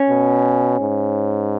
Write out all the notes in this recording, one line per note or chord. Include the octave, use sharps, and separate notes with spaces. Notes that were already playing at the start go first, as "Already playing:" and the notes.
Already playing: C#4
B2
G#2